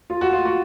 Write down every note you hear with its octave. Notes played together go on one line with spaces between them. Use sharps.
F4
F#4
F4
F#4